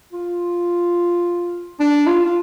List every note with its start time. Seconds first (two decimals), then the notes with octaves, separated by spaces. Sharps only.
0.12 F4
1.80 D4
2.07 F4
2.25 F4